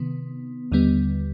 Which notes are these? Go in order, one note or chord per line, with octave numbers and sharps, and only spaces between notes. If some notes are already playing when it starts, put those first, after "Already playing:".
Already playing: C3 D#3 B3
D#2 D3 G3 B3